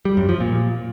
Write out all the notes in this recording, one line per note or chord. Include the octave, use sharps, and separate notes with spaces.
G3
F#2
F3
A#2